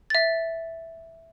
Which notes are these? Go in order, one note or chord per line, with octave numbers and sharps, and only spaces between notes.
E5 A6